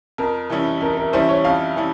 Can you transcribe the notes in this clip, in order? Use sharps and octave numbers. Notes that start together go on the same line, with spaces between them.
F2 A#4
E3 G3 C#4 E4
F2 A#4
A#4
E3 G3 C#4 E4 C5
C#5
F2 F5
E3 G3 C#4 E4